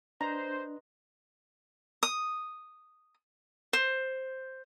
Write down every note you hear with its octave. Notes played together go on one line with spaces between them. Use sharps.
D4 B4 C5 D#5 A#5 C6
D#6
C5